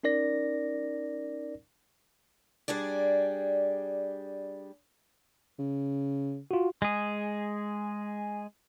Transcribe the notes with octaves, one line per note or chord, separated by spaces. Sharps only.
C#4 D#4 A#4 D5 A#6
G3 D4 G#4 D5
C#3
F4 F#4
G#3 G#4